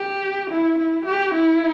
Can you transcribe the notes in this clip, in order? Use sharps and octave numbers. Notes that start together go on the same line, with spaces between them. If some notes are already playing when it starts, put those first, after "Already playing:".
Already playing: G4
E4
E4
G4
E4